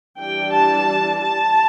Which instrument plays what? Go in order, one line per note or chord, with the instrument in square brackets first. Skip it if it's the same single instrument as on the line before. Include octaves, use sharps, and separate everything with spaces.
[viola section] E3 G3 D4 G5
A5
A5